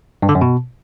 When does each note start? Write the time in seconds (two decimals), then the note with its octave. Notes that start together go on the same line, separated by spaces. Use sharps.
0.22 G2
0.29 D3
0.35 F#2
0.41 B2